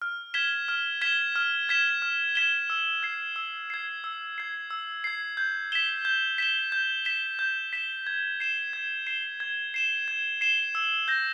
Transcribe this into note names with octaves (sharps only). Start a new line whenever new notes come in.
F6
G#6 B6 E7 G7
F6
G#6 B6 E7 G7
F6
G#6 B6 E7 G7
F6
G#6 B6 E7 G7
E6
G#6 C7
E6
G#6 C7
E6
G#6 C7
E6
G#6 C7
G6
B6 E7 G7
G6
B6 E7 G7
G6
B6 E7 G7
G6
B6 E7 G7
G#6
C7 E7 G7
G#6
C7 E7 G7
G#6
C7 E7 G7
G#6
C7 E7 G7
E6
G6 A#6